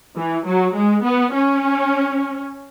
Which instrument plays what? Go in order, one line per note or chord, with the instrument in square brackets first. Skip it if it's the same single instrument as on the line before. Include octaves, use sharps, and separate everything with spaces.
[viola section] E3
F#3
G#3
B3
C#4